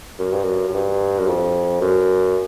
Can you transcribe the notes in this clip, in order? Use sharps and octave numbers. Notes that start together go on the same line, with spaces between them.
F#2
G2
F#2
F#2
G2
F#2
F2
F#2